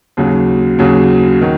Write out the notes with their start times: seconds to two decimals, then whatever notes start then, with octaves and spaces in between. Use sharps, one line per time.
0.17 D#2 C#3 F#3
0.79 D#2 C#3 F#3
1.41 D#3 F#3